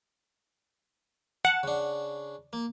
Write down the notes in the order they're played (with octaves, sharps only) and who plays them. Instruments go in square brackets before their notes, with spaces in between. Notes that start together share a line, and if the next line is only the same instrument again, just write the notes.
[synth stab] F#5 [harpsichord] A5
[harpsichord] C#3 D4
A#3